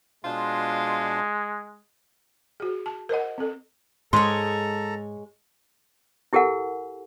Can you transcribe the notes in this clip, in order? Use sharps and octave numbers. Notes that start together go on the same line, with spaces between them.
B2 G#3 D4 F4 C5
F#4 G#4
A5
A#4 C5 D#5 F#5
C4 A4
G#2 G#3 A4 C#5 A#5 C6
E4 G4 A4 A#4 F#5 G#5